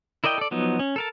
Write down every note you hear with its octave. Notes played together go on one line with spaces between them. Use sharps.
E4 A#4 D5 D#5 G5
A4 D5
F3 F#3 B3 D#4
C#4
A4 A#4 A5